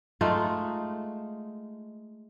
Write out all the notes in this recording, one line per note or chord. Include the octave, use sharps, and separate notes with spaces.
G#3 A3 D#4 F4